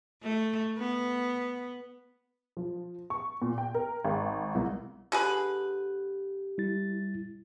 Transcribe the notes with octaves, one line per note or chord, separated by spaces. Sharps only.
A3
B3
F3
C#6
A#2
G5
A#4
G#1
C2
D3 G4 G#4 B4
G3 E4 A6